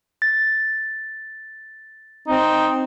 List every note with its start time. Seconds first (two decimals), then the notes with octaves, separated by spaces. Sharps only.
0.22 A6
2.28 C4 D#4